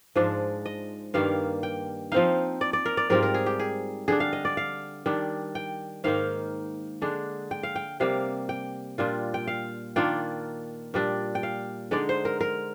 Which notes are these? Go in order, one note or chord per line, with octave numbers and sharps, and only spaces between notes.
G#2 F3 G#3 D4
D#5
G2 D#3 G3 A#3 F5
G5
F3 C4 D#4 F5
D5
D5
A#4
D5
G#2 G3 C4 F4 A#4
A#4
G#4
G4
G#4
D3 G3 D4 G#4
F5
D#5
D5
F5
D#3 G3 D4
G5
G#2 D#3 A#3 D#4 F5
D3 G#3 D4
G5
F5
G5
C3 G3 A#3 F5
G5
A#2 G3 D4 F4
G5
F5
D#3 A#3 D4 F4 G5
A#2 G3 D4
G5
F5
D3 G#3 D#4 D5
C5
A#4
A#4